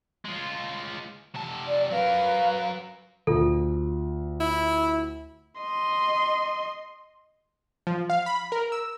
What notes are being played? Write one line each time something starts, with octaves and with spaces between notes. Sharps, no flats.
G#3 F4
C3 A5
D5
F#3 A#4 B4 F5
D2 F4 A4
E4
D#5 C6
F3
F5
B5
A#4
E6